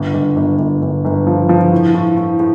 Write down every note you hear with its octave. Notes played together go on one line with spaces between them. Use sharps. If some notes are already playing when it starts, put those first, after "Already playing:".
Already playing: G1
G1
G1
G1
G1
G1
F3
F3
A2
A2
A2
A2